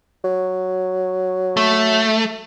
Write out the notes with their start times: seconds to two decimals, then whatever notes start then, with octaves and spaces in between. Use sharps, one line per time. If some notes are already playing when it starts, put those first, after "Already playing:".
0.24 F#3
1.57 A3